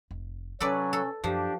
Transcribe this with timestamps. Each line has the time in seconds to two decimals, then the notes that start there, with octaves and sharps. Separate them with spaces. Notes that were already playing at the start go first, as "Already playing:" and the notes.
0.11 F1
0.60 C3 F#3 C#4 A4 B4 D5
0.93 A4
1.24 F#2 F3 D4 G4